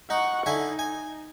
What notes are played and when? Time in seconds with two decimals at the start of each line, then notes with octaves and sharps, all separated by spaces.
0.10 D#4 F#5 C#6
0.46 D3 D#4 E4 G#5
0.79 G#5